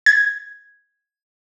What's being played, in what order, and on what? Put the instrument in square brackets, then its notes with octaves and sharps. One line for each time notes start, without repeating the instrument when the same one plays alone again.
[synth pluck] G#6